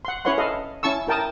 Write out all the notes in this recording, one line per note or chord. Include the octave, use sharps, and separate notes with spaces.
F#5 C6
C#4 E4 B4 C#5 F#5 C6
A4 D#5 F5
C#4 E4 A5 C#6 E6
E4 A#4 G5 A5 A#5 D#6